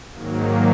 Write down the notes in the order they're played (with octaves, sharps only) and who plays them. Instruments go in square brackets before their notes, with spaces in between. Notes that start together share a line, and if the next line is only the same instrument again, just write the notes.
[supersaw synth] G#2 D#3 F#3 A#3